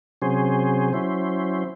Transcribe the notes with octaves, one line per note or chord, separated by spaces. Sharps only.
C3 F#3 C#4 G#4 C5
F#3 C#4 E4 C5